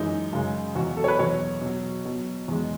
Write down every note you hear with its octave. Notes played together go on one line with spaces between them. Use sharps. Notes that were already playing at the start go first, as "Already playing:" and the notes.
Already playing: F#2 E3 G#3 D#4
F#2 C#3 G#3
E2 B2 F#3 F#4
A4
C#5
B4
E2 B2 F#3 C#5
B2 F#3
B2 F#3
E2 B2 G#3